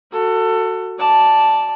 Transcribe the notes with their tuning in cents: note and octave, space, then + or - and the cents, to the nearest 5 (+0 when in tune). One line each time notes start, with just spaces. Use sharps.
F#4 +0 A4 +25
D5 +0 A5 +0